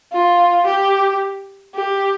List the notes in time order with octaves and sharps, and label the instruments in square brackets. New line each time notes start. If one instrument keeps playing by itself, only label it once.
[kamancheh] F4
G4
G4